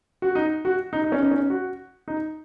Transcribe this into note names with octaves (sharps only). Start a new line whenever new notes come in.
F#4
D#4
F#4
D#4
D#4
C#4
D#4
C#4
F#4
D#4